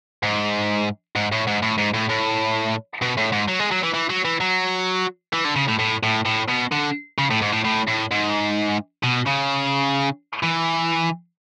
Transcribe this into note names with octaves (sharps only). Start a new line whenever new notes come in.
G#2
G#2
A2
G#2
A2
G#2
A2
A2
B2
A2
G#2
F#3
G#3
F#3
E3
E3
F#3
E3
F#3
E3
D3
C#3
A2
A2
A2
A2
B2
D3
C#3
A2
G#2
A2
A2
A2
G#2
B2
C#3
E3